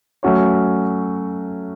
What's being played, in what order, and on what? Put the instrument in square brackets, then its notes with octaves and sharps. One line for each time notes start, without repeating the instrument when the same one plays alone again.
[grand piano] F#3 A3 C#4 F#4 C#5